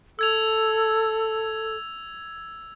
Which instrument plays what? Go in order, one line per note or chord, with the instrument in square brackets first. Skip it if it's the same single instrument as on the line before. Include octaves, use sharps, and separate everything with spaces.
[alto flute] A4 [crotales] E6 G#6 F7